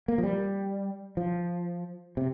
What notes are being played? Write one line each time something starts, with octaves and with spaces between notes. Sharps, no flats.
A#3
F3
G3
F3
C3